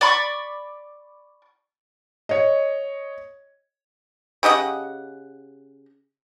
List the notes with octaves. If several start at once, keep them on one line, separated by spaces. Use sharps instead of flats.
D5 B5 C#6
C#5 D#5
C#3 G4 D#5 F#5